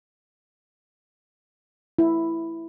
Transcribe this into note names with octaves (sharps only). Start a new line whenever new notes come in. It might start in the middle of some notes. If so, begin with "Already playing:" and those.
E4